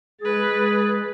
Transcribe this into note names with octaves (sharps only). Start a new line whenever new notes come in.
G#3 G#4 B4 A6